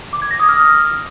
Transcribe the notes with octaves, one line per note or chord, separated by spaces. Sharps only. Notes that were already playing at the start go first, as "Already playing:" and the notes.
D6
G#6
A#6
D#6
F6